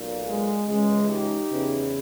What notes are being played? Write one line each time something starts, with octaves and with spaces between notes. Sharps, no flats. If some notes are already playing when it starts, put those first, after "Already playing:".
Already playing: B1 A#2
G#3
C#2 C#3 E3 G#3
D#4 G4
E2 C#3 E3